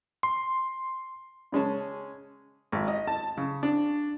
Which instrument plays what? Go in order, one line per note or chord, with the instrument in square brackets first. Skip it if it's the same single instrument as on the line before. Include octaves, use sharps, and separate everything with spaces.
[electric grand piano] C6
[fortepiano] C#3 G#3 C#4 A5
G#1
D#5
A5
C#3
D4